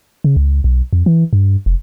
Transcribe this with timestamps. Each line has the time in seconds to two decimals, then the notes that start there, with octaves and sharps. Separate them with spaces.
0.24 C#3
0.37 C#2
0.64 B1
0.93 F2
1.06 E3
1.33 G2
1.66 F1